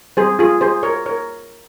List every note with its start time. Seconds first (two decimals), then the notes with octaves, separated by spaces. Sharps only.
0.17 G3 G#4 C5
0.20 C4
0.39 F4 G#4
0.61 G#4 C5
0.83 A#4 C#5
1.06 A#4 C#5